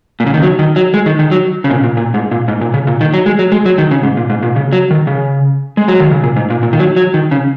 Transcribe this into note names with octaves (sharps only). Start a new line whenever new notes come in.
A#2
C#3
D#3
F#3
D#3
F#3
G#3
D#3
D#3
F#3
C#3
A#2
A#2
A#2
G#2
A#2
G#2
A#2
C#3
A#2
D#3
F#3
G#3
F#3
G#3
F#3
D#3
C#3
G#2
A#2
G#2
A#2
C#3
F#3
D#3
C#3
G#3
F#3
D#3
C#3
A#2
G#2
A#2
A#2
D#3
F#3
F#3
D#3
C#3